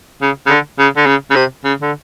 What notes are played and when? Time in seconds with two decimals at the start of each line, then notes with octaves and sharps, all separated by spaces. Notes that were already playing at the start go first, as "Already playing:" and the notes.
0.22 C#3
0.46 C#3
0.50 D3
0.79 C#3
0.97 D3
1.06 C#3
1.30 C#3
1.36 C3
1.64 C#3
1.82 D3